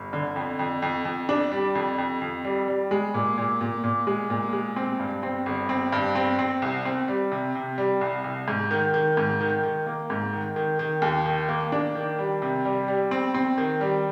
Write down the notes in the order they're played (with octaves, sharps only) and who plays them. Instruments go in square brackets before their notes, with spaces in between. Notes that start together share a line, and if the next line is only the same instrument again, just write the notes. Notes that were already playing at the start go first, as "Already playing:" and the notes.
Already playing: [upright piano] G1
D3
F2
F2
F2
F2
D4
G3
F2
F2
F2
G3
G3
G#3
A#2
A#2
A#2
A#2
G#3
A#2
G#3
C4
G2
C4
G1
C4
G2
C4
C4
C2
C4
G3
C3
C3
G3
C2
C2
G#2
D#3
D#3
G#2
D#3
D#3
A#3
G#2
D#3
D#3
D#3
D#2
D#3
A#3
D4
D#3
G3
C3
G3
G3
C4
C4
D#3
G3